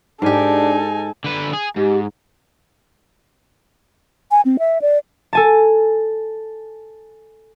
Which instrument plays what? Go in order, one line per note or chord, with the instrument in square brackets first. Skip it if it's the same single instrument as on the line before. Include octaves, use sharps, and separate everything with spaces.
[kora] G#2 G4 [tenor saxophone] D4 [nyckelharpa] D#4 G#5 [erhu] A4
[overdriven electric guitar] D3 B4
G#4
[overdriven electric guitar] G#2 [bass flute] G4
[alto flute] G#5
C4
E5
D5
[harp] A4 G#5 A5